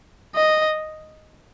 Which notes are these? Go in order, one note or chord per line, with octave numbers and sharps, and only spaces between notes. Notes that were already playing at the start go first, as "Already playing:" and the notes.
D#5